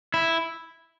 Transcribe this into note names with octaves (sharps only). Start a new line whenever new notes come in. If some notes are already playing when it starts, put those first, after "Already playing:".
E4